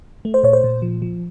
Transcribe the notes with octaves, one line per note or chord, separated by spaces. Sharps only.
A3
C5
A#2 C#5
C5
A#2
F3
F3